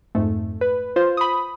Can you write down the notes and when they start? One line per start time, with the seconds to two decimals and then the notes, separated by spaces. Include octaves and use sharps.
0.15 F2 G#2 A3
0.61 B4
0.96 F4 C5
1.17 B5 D#6